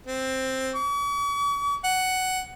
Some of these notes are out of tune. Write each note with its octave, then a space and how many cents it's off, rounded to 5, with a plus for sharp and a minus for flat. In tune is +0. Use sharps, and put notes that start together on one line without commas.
C4 +5
C#6 +45
F#5 +10